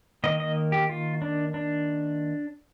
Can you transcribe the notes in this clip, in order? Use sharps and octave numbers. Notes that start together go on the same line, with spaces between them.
D#3 A#3 D#5
D#5
G4
F4
D4
D4